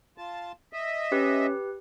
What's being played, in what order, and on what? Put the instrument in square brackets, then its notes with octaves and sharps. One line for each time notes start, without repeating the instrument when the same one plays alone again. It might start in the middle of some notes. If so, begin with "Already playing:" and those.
[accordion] F4 A5
D#5 E5
[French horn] C#4 [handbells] G4 B4